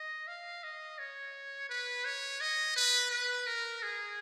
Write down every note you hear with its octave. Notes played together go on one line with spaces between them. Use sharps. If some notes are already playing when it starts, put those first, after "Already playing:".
Already playing: D#5
F5
D#5
C#5
B4
C#5
D#5
B4
B4
A#4
G#4